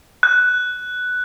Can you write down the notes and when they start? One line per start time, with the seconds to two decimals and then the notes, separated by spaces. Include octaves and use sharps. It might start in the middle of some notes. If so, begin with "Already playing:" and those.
0.23 F#6